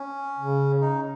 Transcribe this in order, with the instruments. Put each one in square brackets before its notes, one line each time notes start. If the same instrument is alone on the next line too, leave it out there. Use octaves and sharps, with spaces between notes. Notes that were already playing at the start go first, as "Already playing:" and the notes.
Already playing: [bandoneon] C#4
[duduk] C#3
[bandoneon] D#4